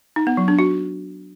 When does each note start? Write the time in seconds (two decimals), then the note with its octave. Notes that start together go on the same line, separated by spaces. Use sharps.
0.16 D#4
0.27 B3
0.37 F#3
0.48 D4
0.59 F#4